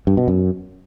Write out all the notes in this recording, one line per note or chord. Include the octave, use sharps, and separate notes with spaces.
G2
B2
F#2